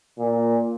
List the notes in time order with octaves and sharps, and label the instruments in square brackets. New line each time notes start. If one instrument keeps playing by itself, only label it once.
[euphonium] A#2